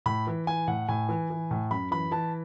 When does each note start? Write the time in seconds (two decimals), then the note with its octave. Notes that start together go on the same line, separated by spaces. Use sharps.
0.06 A2 B5
0.27 E3
0.47 E3 G#5
0.68 A2 F#5
0.89 A2 G#5
1.09 E3
1.30 E3
1.51 A2
1.71 F#2 B5
1.91 E3 B5
2.11 E3 A5